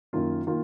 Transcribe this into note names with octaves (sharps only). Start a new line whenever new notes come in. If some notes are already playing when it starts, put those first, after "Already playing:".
F#2 D#3 A#3 F4
D#3 A#3 F4